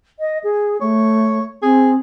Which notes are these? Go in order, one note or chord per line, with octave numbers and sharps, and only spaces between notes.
D#5
G#4
A3 C#5
C4 G#4